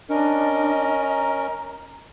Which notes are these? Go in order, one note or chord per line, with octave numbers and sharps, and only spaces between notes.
C#4 D4 A#4 D#5
A#5